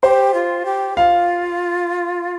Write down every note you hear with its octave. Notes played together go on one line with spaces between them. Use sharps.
G4 C5
F4
G4
F4 F5